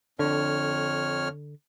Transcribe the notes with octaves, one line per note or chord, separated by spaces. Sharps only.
F2 D3 C#5 F6